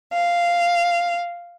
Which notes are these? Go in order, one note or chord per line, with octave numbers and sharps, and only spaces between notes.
F5